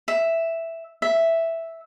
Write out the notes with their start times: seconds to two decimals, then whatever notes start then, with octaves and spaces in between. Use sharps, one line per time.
0.08 E5
1.02 E5